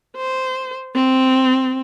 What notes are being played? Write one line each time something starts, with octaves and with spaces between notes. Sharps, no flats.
C5
C4